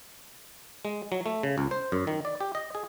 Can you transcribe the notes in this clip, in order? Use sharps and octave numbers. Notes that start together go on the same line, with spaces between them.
G#3
F#3
A3
C#3
C#2
C5
F#2
D#3
D5
G4
D#5
G#4